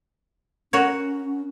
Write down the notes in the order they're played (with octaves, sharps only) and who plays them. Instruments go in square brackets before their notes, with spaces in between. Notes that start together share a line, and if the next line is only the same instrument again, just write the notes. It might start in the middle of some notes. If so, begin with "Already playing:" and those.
[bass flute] C#4 [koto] F#4 A#4 C#5